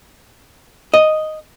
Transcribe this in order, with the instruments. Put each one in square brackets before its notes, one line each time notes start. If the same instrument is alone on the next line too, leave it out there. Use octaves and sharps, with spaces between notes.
[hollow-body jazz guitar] D#5